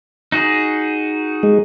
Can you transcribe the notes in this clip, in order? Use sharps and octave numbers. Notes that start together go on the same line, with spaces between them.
D#4 F#4 G#4
G#3